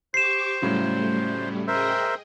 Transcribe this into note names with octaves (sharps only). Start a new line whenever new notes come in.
G4 C5 C#6 D6 C7 E7
A2 C#3 F#3 G3 A3
G#4 A#4 C5 D#5 E5 G5